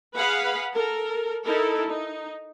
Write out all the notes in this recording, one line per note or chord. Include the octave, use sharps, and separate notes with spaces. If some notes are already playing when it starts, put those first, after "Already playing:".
G#4 B4 F5 F#5 B5
A4 A#4
D#4 E4 A4 A#4
D#4